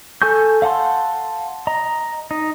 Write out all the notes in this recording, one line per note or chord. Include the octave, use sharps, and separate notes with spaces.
A4 G#5 C#6 G6
F5 F#5 A5 C6
D#5 A#5
D#4